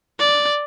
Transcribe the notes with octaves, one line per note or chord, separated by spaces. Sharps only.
D5